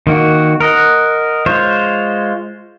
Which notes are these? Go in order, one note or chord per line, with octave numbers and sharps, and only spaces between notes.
D#3 A#3 F#4
A#4 D#5 F#5
G#3 F4 C5 C#5